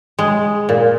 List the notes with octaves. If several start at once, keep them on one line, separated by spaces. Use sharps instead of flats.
G#3
A#2